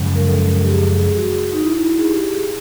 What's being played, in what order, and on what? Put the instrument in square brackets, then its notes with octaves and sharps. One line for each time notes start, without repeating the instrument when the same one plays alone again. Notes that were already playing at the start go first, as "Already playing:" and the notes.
Already playing: [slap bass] F#2 C#3 F3 G#3
[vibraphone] A#4
A4
G4
G#4
F#4
D#4
E4
G#4
G4